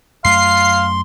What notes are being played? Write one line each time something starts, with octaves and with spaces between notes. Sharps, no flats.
F#2 A3 F5 C6 C7